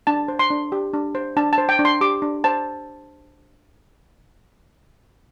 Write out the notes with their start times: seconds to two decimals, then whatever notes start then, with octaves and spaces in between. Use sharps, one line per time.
0.07 D4 A5
0.28 C5
0.39 C6
0.50 D4
0.72 G4
0.94 D4
1.15 C5
1.37 D4 A5
1.53 A5
1.58 C5
1.69 G5
1.79 D4
1.85 C6
2.01 G4 D6
2.22 D4
2.44 C5 A5